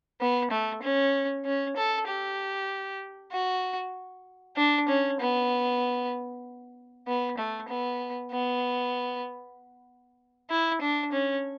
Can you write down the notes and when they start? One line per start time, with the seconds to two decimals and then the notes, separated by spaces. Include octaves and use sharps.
0.21 B3
0.51 A3
0.83 C#4
1.45 C#4
1.77 A4
2.08 G4
3.32 F#4
4.57 D4
4.88 C#4
5.20 B3
7.07 B3
7.38 A3
7.69 B3
8.31 B3
10.50 E4
10.82 D4
11.12 C#4